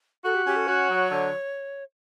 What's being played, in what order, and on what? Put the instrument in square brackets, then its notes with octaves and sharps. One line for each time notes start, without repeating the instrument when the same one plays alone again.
[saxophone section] F#4 [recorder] A4
[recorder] G4
[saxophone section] C#4 [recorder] G4
[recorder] A4
[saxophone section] F#4 [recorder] C#5
[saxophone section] F#3
D3